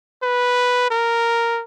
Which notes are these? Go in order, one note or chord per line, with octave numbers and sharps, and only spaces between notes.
B4
A#4